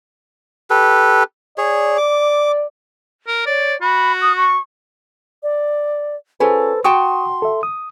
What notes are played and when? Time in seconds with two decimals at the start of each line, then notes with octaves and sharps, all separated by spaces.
0.70 G4 A4 B4
1.58 G#4 C#5 D5
1.98 D6
3.27 A#4
3.46 C#5 D5
3.81 F#4 B5
4.22 D#6
4.37 C#6
5.43 D5
6.40 C#4 F4 G#4 A4 B4 C5
6.84 F#4 G5 A5 C6 C#6 D#6
7.42 A4 E5
7.63 D#6